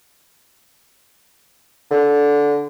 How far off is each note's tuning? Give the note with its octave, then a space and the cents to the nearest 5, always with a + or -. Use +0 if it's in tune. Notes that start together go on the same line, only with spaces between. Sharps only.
D3 -15